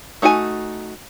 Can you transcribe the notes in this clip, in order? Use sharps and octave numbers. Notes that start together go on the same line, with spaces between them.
A3 D#4 F#4 G#4 G#5